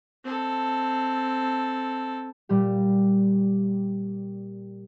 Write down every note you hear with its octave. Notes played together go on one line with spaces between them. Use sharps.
C4 A4
A#2 G3 G4